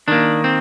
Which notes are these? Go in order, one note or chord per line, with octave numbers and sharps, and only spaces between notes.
D#3 A#3 D4
C4